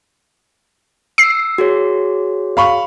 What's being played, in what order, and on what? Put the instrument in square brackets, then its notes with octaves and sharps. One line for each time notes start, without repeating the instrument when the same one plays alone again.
[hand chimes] E6 [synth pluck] C7
[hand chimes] F#4 G#4 C#5
[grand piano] F5 B5 C#6